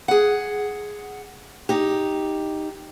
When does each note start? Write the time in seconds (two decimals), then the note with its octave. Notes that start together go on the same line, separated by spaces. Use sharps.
0.08 G#4 F#5
1.69 D#4 G4